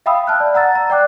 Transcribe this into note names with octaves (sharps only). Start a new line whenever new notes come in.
E5 F5 G5 B5 D#6 E6
A5 F6 F#6
D5
F#5 A#5 E6 A6
A#5
D5 G5 D6 F#6